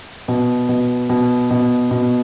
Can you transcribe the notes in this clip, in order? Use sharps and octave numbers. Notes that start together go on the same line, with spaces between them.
B2
B2
B2
B2
B2